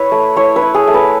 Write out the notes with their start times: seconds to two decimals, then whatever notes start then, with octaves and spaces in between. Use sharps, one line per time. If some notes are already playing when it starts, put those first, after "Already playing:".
Already playing: E4 B4 C#5
0.12 A3
0.36 E4 C#5
0.56 B4
0.62 E4
0.74 G#4
0.87 A3
0.94 B4